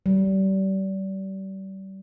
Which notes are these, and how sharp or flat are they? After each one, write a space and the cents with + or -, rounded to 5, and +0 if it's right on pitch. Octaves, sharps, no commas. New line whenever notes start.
G3 -30